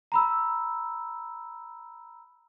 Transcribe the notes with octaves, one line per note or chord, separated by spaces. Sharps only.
A#5 B5 E6